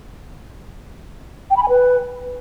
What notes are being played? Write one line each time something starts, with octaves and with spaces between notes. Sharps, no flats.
G5
B5
G#5
B4